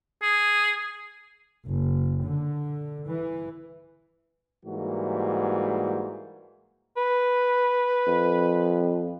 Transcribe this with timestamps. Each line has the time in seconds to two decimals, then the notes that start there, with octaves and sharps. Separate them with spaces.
0.22 G#4
1.65 F#1
2.23 D3
3.06 E3
4.64 G#2 E3 G3 A#3 F#4
6.97 B4
8.07 F2